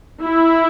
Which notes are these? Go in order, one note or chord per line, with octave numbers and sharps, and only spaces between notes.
E4